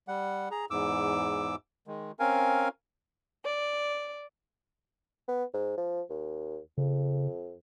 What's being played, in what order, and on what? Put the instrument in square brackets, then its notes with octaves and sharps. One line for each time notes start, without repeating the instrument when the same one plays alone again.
[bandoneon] G3 F#5
G#4 A#5
E2 G#2 D6 E6
D#3 G#3
C4 C#4 A#4 F5 G#5
[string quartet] D5
[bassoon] B3
G#2
F3
D#2
[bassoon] F2 [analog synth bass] C#3